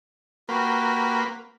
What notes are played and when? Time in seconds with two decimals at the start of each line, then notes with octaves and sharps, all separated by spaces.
0.49 A#3 F#4 G4 B4 C6